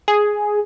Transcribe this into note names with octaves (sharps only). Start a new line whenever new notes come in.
G#4